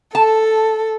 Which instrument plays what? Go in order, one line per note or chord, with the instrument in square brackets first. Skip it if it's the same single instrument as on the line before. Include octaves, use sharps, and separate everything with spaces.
[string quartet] A4 [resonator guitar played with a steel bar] A5